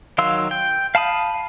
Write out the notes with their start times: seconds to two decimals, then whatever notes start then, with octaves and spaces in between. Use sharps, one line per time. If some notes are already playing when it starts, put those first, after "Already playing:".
0.18 D#3 F#3 F5 C6 E6
0.51 G5
0.95 F5 A5 B5 D#6